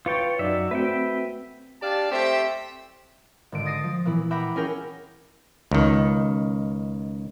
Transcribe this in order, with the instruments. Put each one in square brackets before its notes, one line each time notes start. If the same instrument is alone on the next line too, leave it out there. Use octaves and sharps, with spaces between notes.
[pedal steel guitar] F4 C#5 G5 [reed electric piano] B4 C#6 A6
[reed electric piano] F#2 D#4 D5 [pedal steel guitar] F#3 E5
[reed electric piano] A3 C4 F#4 [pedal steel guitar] B4 E5 G5
[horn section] D4 G4 D5 F5 A5
A3 C4 G4 C5 E5
[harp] G#1 D3 D7
D#6 A6 A#6 C7 D7 D#7
F3
A#2 E3 B3 E4
E5 F#5 G5 A#5 B5 D6
C#4 F4 G#4 A#4 C#5 G5
[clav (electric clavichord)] C#2 D#3